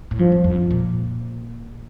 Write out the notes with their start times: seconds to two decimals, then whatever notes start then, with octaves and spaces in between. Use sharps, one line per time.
0.11 A2
0.19 G2 F3
0.32 F2
0.44 F2
0.71 A#2